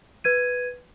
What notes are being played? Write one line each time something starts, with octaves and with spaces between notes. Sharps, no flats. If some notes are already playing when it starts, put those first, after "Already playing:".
B4 G#6 D#7